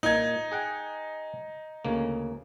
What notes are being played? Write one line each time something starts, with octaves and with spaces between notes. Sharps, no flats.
A#2 D#4 G#6
G#4 F#5 G5
D2 C#3 A#3